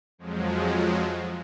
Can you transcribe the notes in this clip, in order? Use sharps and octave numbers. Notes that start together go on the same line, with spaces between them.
F2 F3 F#3 G#3